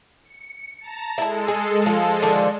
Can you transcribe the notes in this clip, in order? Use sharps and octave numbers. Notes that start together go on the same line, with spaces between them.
C#7
A5 A#5
G#3 E4 A4 A5
G#4
F3
D3 D#3 F3